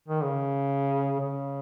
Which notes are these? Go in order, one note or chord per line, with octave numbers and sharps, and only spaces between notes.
D#3
C#3
C#3